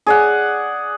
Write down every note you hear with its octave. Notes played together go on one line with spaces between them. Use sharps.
G#4 D5 F#5